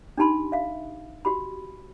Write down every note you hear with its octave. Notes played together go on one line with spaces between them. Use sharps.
D4 D#4 G4 A5 B5 C6
E5 F5
F#4 G4 B5